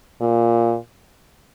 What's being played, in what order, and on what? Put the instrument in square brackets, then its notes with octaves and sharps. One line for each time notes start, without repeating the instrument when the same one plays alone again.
[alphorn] A#2